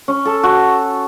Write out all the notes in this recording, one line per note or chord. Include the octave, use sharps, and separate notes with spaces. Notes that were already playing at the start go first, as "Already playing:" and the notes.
C#4
A4
F#4